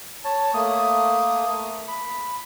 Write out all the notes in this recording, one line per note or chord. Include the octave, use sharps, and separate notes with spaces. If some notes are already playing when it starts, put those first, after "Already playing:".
C#5 A5
A3 A#3 D#6
B5